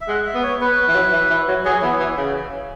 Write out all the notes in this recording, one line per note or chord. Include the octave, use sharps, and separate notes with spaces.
E5
G#3 F#5
E5
B3
C#5
B3 B4
E3
F#3
E3
E3
F#3
F#3 G#4
E3 B3
E3
C#3